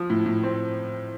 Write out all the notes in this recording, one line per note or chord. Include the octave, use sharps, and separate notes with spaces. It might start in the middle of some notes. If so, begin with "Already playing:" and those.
Already playing: F3
A2
A2
C4